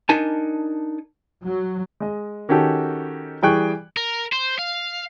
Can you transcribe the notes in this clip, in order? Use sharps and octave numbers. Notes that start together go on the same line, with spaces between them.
D4 D#4 A#4 G#5 A5
F#3
G#3 D#5
D#3 C#4 F#4 G4 A4
E3 G3 G#4 G5 C#6 F#6
A#4
C5
F5